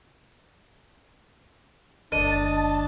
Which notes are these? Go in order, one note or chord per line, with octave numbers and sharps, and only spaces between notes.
F#1 D2 D4 D#5 A5